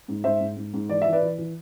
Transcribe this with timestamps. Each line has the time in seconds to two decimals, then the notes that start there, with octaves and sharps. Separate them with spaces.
0.08 G#2
0.24 G#2 C5 E5
0.40 G#2
0.56 G#2
0.73 G#2
0.89 E3 D5
1.02 E3 E5
1.13 B4 D5
1.22 E3
1.38 E3